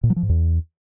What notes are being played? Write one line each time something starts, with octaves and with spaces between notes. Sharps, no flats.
A#2
F#3
F3
G#2
E2